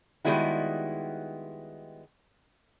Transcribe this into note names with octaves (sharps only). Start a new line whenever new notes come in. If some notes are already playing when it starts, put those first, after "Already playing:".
D#3 G3 G#3 B3 E4 F#4